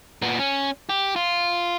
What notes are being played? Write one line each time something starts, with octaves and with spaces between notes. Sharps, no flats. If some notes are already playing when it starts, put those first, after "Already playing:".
A#2 B3
C#4
G4
F4